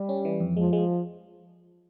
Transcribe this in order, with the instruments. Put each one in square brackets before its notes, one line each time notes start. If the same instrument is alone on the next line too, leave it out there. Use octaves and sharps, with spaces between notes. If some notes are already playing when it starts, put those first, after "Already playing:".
Already playing: [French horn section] G3
[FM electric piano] C#4
E3
F2
[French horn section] F3 [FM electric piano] G#3
[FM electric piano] G#3